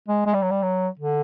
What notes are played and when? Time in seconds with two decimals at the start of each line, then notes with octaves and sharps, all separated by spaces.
0.08 G#3
0.26 G#3
0.34 G3
0.43 F#3
0.51 G3
0.63 F#3
1.00 D3